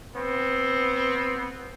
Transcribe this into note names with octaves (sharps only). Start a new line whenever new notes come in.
B3 C4